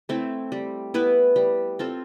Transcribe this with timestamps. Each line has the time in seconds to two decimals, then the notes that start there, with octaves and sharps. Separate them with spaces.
0.09 A3 C4 E4
0.52 G3
0.94 B3 E4 B4
1.36 G3
1.79 C4 F4 A4